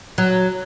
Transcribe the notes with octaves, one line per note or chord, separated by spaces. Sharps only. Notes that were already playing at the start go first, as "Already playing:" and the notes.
F#3